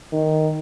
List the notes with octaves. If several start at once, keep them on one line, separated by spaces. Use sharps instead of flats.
D#3